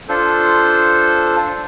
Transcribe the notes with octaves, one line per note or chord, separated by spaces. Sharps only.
D4 F4 A4 C5